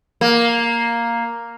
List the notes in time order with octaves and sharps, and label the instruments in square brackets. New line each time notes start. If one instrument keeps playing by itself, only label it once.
[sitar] A#3